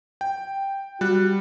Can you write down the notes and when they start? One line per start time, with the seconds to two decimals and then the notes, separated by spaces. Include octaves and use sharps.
0.21 G5
1.01 G3 F#4 F#6